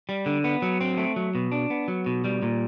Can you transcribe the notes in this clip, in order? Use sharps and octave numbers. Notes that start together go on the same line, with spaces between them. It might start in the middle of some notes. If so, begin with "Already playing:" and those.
G3
D3
B3
F#3
C4
A3
F#3
B2
D4
B3
F#3
B2
G3
A#2